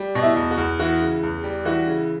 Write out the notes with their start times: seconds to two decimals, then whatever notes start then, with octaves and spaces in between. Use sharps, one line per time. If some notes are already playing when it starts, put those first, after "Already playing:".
Already playing: G3
0.15 B2
0.23 E4
0.36 E2
0.51 F#4
0.58 E2
0.79 E3 F#4
1.02 C#3
1.23 E2
1.44 G3
1.65 E3 F#4
1.87 C#3